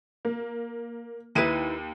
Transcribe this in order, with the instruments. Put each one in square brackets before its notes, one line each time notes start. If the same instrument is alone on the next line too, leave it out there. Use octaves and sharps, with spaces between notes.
[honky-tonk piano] A#3
[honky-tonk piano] D#2 D#7 [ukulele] D#4 E4 B4